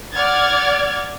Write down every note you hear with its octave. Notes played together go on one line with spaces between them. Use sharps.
D5 F#5 F6 G#6 A6